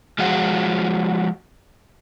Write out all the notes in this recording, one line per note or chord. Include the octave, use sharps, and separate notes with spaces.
F3 G#3 F4 F#4